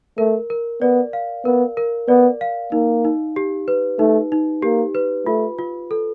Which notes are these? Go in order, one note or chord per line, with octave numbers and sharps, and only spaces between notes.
A3 A#4
A#4
B3 D5
F5
B3 A#4
A#4
B3 D5
F5
A#3 D#4
D#4
G4
B4
A3 D#4
D#4
A#3 G4
B4
A3 F4
F4
A4